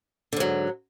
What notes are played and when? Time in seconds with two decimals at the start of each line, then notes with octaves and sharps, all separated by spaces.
0.33 D3
0.36 G#2
0.40 F#3